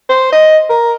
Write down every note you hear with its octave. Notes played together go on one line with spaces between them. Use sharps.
C5
D#5
A#4